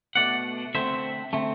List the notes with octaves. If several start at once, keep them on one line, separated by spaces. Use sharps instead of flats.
B2 A3 D4 D5 F#5
D3 A3 C4 C5 E5
D3 A3 C4